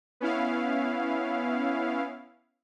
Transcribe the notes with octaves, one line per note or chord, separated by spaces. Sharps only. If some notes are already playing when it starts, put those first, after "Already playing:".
B3 C#4 E4 F5